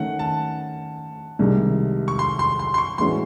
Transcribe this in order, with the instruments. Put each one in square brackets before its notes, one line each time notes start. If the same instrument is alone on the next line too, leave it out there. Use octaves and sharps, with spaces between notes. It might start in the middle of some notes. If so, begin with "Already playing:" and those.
Already playing: [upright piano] D#3 A3 C#4 [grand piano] F#5
[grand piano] A5
[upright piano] C2 C3 D#3 G#3
[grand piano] C#6
C6
C6
C6
C6
C#6
[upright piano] A2 E3 G#3 C#4 F#4 [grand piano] C6